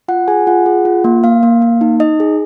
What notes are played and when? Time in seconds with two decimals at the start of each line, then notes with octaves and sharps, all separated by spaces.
0.08 F4 F#5
0.28 G#4 G#5
0.47 F4 F#5
0.66 G#4
0.85 F4
1.04 A#3
1.24 A#3 F5
1.43 A#3
1.62 A#3
1.81 D#4
2.00 D#4 D#5
2.20 G#4